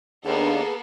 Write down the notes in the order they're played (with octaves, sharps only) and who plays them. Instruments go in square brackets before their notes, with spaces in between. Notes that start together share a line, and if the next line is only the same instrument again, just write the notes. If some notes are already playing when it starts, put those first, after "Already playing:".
[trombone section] D#2 [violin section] A#3 B3 A4 [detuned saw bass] D4 [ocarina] G#4